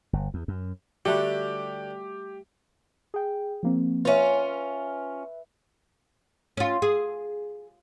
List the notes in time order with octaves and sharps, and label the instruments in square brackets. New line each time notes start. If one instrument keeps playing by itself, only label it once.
[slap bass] G1
E2
F#2
[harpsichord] D3 [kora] G3 A3 F#4 [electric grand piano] G4
[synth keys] G#4 G5
F3 A#3 C4
[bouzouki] C#4 F4 [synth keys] B4 E5
[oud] C#4 F4
G#4